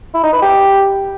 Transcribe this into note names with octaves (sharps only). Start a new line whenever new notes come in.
E4
D#4
B4
G4